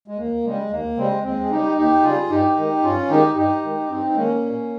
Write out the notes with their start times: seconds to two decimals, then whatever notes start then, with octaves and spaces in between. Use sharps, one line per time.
0.08 G#3
0.18 D#2 A#3
0.44 C#3 G3 G#3
0.70 D#2 A#3
0.97 C#3 G3 G#3 C4
1.24 D#2 G#3 C4
1.43 G#4
1.50 C#3 G3 D#4 G4
1.77 D#2 D#4 G4
2.03 C#3 G3 F4 G#4
2.30 G2 D#4 G4
2.57 D#3 G#3
2.83 G2 C#4 F4
3.09 D#3 G#3 D#4 G4
3.35 G2 D#4 G4
3.63 D#3 G#3
3.89 G2 C4 D#4
4.07 D#4
4.15 D#3 G#3 A#3 C#4
4.42 A#2